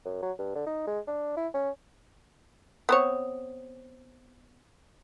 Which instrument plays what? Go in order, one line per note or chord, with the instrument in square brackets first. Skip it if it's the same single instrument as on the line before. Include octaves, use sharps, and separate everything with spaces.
[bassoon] F#2
F#3
G2
D3
D#4
G#3
D4
E4
C#4
[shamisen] B3 C4 C#5